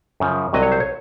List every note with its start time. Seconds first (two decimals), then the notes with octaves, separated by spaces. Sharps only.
0.20 F#2 C#3 F3
0.53 C2 C3 F#3 D#5
0.63 C#5
0.72 C5
0.80 C#5